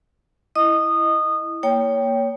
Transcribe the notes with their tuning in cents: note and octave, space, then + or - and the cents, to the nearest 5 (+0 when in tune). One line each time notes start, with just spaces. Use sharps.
E4 +0 D#5 +0 D#6 -20
A#3 +0 C#5 +20 G5 +0